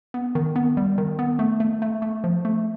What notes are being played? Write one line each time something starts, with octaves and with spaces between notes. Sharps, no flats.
B3
D#3
B3
G3
D#3
B3
A3
A3
A3
A3
F3
A3